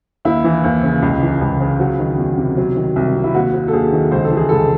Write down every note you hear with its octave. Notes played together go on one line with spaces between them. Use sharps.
D#2 E4
E3
D#2
C#3
C#2
E3
C#2
C#3
F#3 F#4
D#3
E2
C3
F#3
D#3
C2
C3
E4
D#2 F#4
F#3
A4
D#2 G#4
D#3
C#2 C5
A4
E3
G#4
C#2 A4